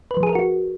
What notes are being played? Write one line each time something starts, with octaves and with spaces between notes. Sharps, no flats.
B4
F3
G#4
A#4
F#4